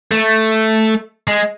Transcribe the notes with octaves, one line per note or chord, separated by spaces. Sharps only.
A3
G#3